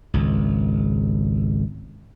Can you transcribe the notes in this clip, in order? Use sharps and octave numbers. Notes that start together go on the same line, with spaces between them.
G#1 C#2